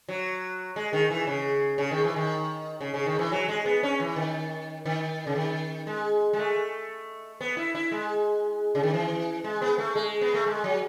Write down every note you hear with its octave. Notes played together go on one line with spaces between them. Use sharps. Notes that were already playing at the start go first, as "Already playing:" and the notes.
F#3
G#3
D#3
E3
C#3
C#3
D#3
E3
D#3
C#3
C#3
D#3
E3
F#3
G#3
B3
C#4
E3
D#3
D#3
C#3
D#3
G#3
G#3
A3
B3
E4
E4
G#3
C#3
D#3
E3
G#3
B3
A3
G#3
B3
A3
G#3
F#3